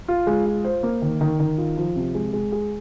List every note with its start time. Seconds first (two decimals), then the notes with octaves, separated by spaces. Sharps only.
0.08 F4
0.27 G#3
0.46 F4
0.64 C5
0.83 A#3
1.02 D#3
1.21 D#3
1.40 D#3
1.58 F4
1.77 F3
1.96 C3
2.14 G#3
2.33 G#3
2.52 G#4